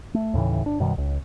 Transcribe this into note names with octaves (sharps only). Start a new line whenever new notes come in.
A3
D#2 A2 C#3 E3
G1 D4
F#2 B2 D#3 G3
C#2